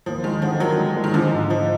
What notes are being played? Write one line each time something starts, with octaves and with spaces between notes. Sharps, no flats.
D#2 F3
D#3 G#3
D3 F3
D#3 F#3
G#3
G#3
D#3
D3 F3
G#2
G#2 F3